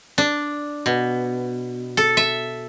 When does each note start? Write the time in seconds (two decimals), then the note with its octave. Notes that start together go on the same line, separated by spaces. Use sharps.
0.18 D4
0.86 B2
1.97 A4
2.17 E5